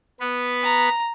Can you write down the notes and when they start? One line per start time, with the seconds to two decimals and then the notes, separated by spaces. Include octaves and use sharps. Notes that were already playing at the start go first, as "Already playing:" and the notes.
0.20 B3 B4
0.63 A#5